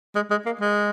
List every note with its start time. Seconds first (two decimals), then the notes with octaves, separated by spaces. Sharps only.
0.15 G#3
0.31 G#3
0.46 A#3
0.61 G#3